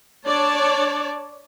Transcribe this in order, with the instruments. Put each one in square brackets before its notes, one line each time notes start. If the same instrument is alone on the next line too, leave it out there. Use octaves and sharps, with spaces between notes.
[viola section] D4 C#5 D5 A5